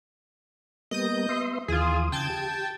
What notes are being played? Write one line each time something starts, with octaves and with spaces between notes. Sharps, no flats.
G3 A#3 B3 D#5 D#6 G6
B3 E5 C6
D#2 E3 F4 G#4 D#6
C#3 G5 A5 G6 G#6
G4